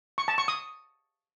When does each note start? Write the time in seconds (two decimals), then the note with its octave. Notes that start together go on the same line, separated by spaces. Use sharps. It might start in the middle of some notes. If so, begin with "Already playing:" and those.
0.18 C#6
0.28 A5
0.38 C#6
0.48 D#6